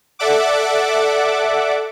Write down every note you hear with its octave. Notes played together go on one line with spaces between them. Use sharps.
A4 D5 E5 F#5 D6